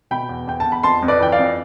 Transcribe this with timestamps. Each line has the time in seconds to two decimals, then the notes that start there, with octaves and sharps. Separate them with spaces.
0.11 B2 G5 B5
0.29 E2
0.47 E2 G5
0.60 A5
0.66 E2
0.72 B5
0.83 F2 A5 C6
1.02 F2
1.08 B4 D5
1.20 E3 G5
1.32 D5 F5
1.39 F2